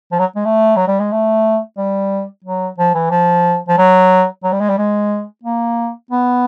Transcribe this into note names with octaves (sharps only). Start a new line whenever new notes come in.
F3
F#3
G#3
A3
F#3
G3
G#3
A3
G3
F#3
F3
E3
F3
F3
F#3
F#3
G3
G#3
G3
G#3
A#3
B3